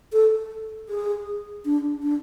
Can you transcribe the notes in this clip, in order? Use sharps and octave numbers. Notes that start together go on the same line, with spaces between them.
A4
G#4
D4
D4